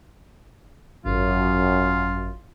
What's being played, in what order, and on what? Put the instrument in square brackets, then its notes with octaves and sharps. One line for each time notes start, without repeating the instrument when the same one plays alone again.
[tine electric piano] G#1 [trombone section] F#2 [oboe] F4